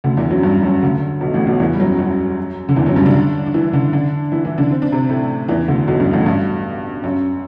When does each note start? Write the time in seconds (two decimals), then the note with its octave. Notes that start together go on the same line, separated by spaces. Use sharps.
0.04 D2 D3
0.17 E2 E3
0.30 F#2 F#3
0.43 G2 G3
0.63 F#2 F#3
0.82 D2 D3
1.21 B1 B2
1.34 A1 A2
1.47 B1 B2
1.60 E2 E3
1.73 G3
1.80 F#2 F#3
1.99 F#2 F#3
2.69 D3
2.76 E2 E3
2.86 F#2 F#3
2.96 G2 G3
3.06 D3 D4
3.46 D4
3.54 E3 E4
3.73 D3 D4
3.93 D3 D4
4.32 E3 E4
4.45 E3 E4
4.58 D3 D4
4.71 C4
4.82 D4
4.92 C3 C4
5.09 A2 A3
5.48 E2 E3
5.68 D2 D3
5.87 B1 B2
6.00 G2
6.13 A1 A2
6.26 G2
7.04 F#2